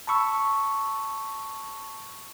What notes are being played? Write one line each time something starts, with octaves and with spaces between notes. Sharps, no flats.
A5 B5 C#6 E6